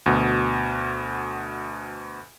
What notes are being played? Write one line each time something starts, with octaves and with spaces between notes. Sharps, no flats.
D2 B2